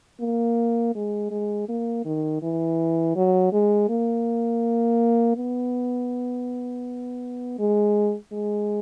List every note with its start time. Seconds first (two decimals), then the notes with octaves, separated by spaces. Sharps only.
0.21 A#3
0.95 G#3
1.31 G#3
1.68 A#3
2.05 D#3
2.42 E3
3.16 F#3
3.53 G#3
3.89 A#3
5.37 B3
7.59 G#3
8.32 G#3